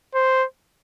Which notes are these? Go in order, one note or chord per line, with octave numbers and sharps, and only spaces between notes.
C5